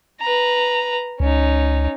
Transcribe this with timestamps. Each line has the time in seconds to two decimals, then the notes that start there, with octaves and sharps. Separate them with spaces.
0.21 B4 A#5
1.20 C#2 C#4 D#4